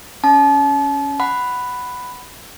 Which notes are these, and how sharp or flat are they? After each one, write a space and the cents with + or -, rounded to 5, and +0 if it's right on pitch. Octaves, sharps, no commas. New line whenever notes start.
C#4 +5 A5 -35
F#5 +0 B5 +5